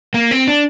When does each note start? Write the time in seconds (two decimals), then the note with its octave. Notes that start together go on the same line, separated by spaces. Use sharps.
0.14 A#3
0.31 C4
0.47 D4